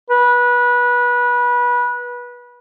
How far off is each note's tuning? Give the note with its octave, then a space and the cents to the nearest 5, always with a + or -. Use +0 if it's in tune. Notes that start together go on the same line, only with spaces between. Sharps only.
B4 -25